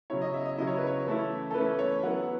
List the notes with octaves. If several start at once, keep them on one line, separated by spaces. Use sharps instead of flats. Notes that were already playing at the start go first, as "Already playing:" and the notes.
C#3 F#3 C#4 E4 C#5
D#5
E5
D#5
C#3 F#3 C#4 E4 D#5
C#5
B4
C#5
E3 A3 C#4 E4
A4
E3 A3 C#4 E4 B4
C#5
F#3 B3 E4 F#5